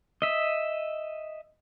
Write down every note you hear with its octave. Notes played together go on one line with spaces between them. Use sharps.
D#5 E5